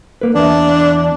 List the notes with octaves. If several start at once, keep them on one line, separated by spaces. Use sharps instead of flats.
A#3 B4
E2 D4 E5